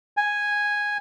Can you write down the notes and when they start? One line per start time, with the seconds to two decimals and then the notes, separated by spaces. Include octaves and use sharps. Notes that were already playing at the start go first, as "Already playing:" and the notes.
0.17 G#5